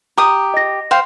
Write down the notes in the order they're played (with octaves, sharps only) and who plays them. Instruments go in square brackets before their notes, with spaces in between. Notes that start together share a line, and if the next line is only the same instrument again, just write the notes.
[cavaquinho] G4 D#6 [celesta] A#5
[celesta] D#5 A#6
[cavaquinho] C5 F5 G5